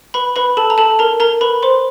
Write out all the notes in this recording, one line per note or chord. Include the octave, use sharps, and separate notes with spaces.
B4 B5
B4 B5
A4 A5
A#5
A4 A5
A#4 A#5
A#4 A#5
B4 B5
C5 C6